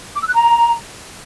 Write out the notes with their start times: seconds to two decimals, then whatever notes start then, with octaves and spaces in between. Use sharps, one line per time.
0.16 D6
0.22 E6
0.28 F#6
0.34 A#5